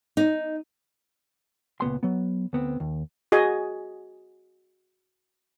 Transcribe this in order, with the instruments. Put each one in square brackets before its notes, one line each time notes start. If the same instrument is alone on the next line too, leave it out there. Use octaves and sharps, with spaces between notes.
[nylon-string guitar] D#4
[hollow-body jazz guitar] C#2 A#2 B3 C6
F#3 B3
D2 B3 C4
D#2
[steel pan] F#4 G#4 D#5 G#5